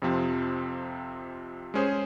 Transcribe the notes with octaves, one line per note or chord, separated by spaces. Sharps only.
F2 C3 F3 C4
G#3 C#4 G#4 C5